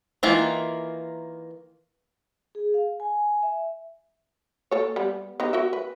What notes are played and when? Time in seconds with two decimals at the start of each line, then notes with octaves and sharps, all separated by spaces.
0.23 D#3 E3 A#3 F4
2.55 G#4
2.74 F5
3.00 G#5
3.43 E5
4.71 A#3 A4 C#5
4.96 G3 B3
5.40 B3 D#4 G4
5.53 F#4 A#4 E5
5.73 B4